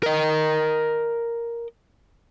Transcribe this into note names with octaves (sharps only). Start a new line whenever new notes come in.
A#4 D#5